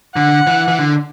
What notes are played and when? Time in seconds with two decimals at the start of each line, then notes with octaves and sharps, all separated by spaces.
0.16 D3 F#5
0.47 E3
0.68 E3
0.79 D3